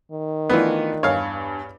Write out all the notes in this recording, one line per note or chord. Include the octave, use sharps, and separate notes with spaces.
D#3
E3 A3 B3 D4 F4
E2 G2 C#5 F5